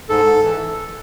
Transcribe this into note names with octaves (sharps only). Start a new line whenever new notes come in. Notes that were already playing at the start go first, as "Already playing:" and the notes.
G#2 A4
E3